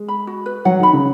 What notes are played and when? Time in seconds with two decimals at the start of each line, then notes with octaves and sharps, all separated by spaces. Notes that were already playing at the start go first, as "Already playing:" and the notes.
Already playing: G#3
0.08 B5
0.27 F#4
0.46 B4
0.65 F#3 F#5
0.80 D#3 B5
0.93 C#3